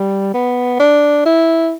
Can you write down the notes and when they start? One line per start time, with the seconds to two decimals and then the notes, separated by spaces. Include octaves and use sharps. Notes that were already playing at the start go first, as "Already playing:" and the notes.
Already playing: G3
0.34 B3
0.80 D4
1.26 E4